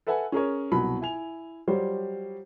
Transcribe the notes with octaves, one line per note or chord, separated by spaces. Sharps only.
A4 B4 E5 F#5 G#5
C#4 G#4 A#4 C#5
C2 B2 F#3 B5
E4 G#5 F7
F#3 G3 F4 G4 C5 C#5